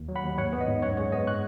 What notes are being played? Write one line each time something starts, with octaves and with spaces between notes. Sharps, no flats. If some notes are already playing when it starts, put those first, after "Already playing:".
Already playing: D#2
F#3
F#5 B5
D#2
G#2 C#5 F#5
B3
D#5
G#2
F#2 C#5 F#5
G#3 C#5
B3 D#5
C#6 F#6